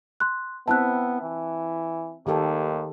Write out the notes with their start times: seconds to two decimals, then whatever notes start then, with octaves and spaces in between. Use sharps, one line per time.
0.20 C6 F#6
0.68 B3 C4 E4 E5 A5 F#6
1.22 E3
2.27 D#2 D#3 G4 A4